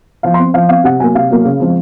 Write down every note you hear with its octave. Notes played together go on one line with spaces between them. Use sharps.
F3 F5
C6
C4
F3 F5
C4 F5
C3 F#5
F#3 A#3 G#5
C3 F5
F#3 A#3
C#3
F3 G#3 C4